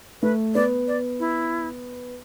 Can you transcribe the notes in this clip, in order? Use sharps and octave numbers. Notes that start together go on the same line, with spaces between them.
A3 B4
B3 D5
D5
E4